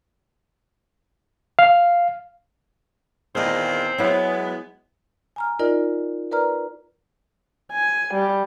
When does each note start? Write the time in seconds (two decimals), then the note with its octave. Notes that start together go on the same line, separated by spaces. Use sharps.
1.59 F5
3.35 E2 A#2 D#3 C4 G#4 D#5
3.98 F#3 G#3 B3 E4
5.36 G#5 A#5 F6
5.59 D#4 F4 A#4 D5 D#5
6.31 A#4 B4 D5 A#5 F6
7.72 G#5
8.14 G3